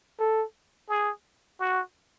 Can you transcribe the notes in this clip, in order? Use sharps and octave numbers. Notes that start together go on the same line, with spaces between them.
A4
G#4
F#4